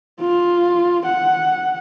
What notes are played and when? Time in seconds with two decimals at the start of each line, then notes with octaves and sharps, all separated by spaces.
0.20 F4
1.06 F#5